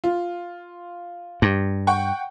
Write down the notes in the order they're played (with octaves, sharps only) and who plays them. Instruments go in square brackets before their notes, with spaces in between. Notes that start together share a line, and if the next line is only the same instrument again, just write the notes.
[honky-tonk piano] F4
[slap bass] G2
[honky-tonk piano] F#5 G5 C#6